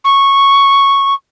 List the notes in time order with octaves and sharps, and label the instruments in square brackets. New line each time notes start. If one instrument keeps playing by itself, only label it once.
[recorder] C#6